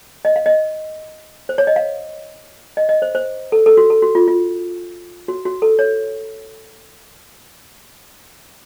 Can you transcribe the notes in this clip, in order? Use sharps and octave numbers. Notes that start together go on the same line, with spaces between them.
D#5
F5
D#5
C5
C#5
D#5
F5
D#5
D#5
C5
C5
A4
A4
F#4
A4
F#4
F4
F4
F#4
F#4
A4
C#5